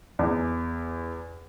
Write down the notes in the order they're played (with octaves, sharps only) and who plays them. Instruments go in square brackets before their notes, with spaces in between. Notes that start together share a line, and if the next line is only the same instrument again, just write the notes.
[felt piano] E2